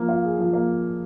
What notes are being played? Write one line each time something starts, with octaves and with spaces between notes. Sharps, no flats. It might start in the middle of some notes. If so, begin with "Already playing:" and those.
Already playing: F3 A#3
F4
G#4
F3
A#3